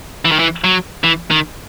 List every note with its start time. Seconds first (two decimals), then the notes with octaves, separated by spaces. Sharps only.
0.25 E3
0.32 D#3
0.39 E3
0.64 F#3
1.04 E3
1.31 D#3